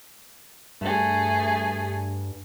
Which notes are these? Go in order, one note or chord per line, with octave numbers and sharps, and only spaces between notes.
G2 A3 G#4